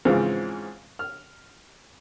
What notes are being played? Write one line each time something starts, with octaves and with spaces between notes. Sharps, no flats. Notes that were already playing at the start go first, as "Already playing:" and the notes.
G#2 C#3 E3 F3 C4 F4
F6